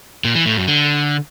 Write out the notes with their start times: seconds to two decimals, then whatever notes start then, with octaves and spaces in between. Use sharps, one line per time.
0.24 A#2
0.35 E3
0.46 A2
0.57 F#2
0.67 D3